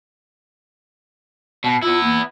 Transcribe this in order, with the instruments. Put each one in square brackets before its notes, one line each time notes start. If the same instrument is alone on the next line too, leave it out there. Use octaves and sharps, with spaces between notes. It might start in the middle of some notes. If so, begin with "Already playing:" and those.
[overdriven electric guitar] B2
[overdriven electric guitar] B3 E4 [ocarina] F4
[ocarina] A#3